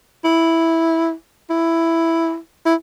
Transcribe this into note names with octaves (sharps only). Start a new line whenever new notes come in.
E4
E4
E4